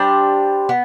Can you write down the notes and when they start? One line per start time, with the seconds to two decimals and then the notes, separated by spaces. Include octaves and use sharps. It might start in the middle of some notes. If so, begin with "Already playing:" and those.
Already playing: G3 D4 G4 C5
0.69 B3